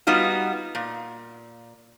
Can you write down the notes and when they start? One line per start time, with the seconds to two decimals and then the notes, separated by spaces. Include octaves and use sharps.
0.07 G3 B3 D#4 F4 F#4
0.75 A#2